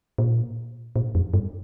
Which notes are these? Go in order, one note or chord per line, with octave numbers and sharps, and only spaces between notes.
A#2
A#2
F2
G2